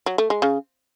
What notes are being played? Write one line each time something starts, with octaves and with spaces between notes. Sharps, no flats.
F#3
A3
G#3
C#3